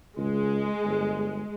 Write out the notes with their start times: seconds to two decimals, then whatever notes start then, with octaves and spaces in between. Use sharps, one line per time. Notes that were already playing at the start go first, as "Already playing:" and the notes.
0.17 C#2 G#3
0.84 G1